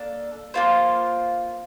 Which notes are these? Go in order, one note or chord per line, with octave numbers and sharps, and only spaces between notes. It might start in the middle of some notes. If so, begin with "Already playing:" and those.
Already playing: A#3 D4 A4
A#3 F4 C5